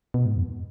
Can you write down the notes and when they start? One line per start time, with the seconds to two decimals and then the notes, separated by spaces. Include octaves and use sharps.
0.14 B2
0.26 G#2
0.37 F2